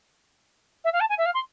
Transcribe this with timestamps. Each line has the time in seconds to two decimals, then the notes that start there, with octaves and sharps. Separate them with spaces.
0.84 E5
0.93 F5
1.00 A5
1.09 G#5
1.18 E5
1.25 F5
1.34 C6